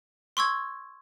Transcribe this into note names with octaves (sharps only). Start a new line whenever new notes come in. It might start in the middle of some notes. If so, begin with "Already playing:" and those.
C6 C#6 E6 G#6